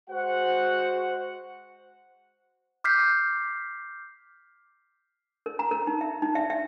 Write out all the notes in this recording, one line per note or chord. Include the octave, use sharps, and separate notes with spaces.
G#3 F#4 C5 F#5
D6 F6 G6 B6 C7
A#4
A#5
A#4
D#4
E5
D#4
E5
E5